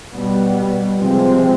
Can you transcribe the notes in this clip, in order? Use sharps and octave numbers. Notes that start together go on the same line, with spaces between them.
B2 G3 B3
C3 F3 G#3 C4